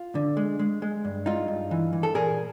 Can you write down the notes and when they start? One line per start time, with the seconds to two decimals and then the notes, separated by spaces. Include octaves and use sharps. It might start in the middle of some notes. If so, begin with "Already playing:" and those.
Already playing: F4
0.15 D3
0.37 G#3
0.59 G#3
0.82 G#3
1.05 G2
1.26 G#3 D#4 F4
1.48 G2
1.71 E3
1.93 E3
2.03 A4
2.14 A#2 G#4 A#4